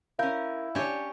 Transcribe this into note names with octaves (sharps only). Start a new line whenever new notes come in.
C#4 E4 A#4 F5 G6
C#4 D4 G4 C#5